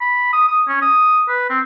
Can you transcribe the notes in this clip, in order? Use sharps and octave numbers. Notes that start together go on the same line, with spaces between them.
B5
D#6
D#6
C#4
D#6
B4
C4